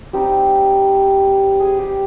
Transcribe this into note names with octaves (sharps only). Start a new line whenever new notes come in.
G3 C4 D#4 G4
G#4
G4